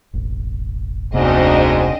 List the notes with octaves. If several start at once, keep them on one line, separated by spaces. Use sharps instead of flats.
E1 A1
F1 D2 G#2 C3 B3 C4 D4 D#5